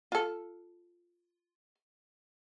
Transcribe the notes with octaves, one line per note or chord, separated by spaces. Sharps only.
F4 A4